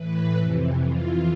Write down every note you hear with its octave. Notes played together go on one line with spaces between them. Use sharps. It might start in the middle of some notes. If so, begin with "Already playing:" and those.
Already playing: A2 E3 B4
F2 C3 E3
F2 E3 F4